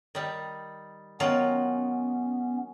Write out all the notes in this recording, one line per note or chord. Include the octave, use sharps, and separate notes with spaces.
D#3 G3
D#3 F#3 B3 C#4 F4